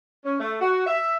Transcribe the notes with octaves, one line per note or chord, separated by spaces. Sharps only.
C#4
A3
F#4
E5